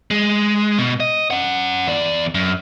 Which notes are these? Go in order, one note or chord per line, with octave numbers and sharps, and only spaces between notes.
G#3
B2
D#5
C#4 F#5
E2 D5
F#2